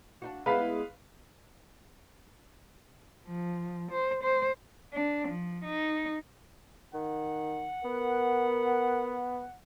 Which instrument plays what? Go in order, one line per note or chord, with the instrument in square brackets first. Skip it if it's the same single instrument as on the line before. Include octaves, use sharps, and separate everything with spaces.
[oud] D4 D#4 F#4
[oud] G#3 B3 E4 [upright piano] B4 F5 B5
[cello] F3
C5
C5
D4
F3
D#4
[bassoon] D#3 [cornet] F#5
[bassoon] B3 [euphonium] A#4